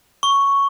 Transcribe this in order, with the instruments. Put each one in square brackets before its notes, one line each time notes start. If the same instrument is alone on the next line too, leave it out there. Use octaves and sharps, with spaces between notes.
[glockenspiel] C#6